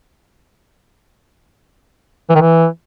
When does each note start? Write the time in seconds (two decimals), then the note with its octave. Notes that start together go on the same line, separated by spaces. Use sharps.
2.30 E3
2.35 D#3
2.41 E3